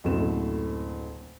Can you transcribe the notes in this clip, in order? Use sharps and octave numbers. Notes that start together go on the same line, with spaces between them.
F#1 D2 A2 C3 A4 E7